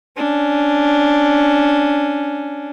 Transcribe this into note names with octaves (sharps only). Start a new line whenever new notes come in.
C#4 D4